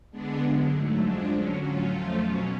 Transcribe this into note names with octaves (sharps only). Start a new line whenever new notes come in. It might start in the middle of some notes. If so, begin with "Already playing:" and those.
D3 G#3 B3 D4
F#2 D3 G#3
G#2 F#3 A3
F2 F3 G#3 D4
D3 F#3 C#4
A2 F#3 C#4 F4
F2 F3 A3 F4
B2 F#3 C#4